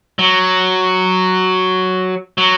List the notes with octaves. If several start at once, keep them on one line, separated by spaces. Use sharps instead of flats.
F#3
F#3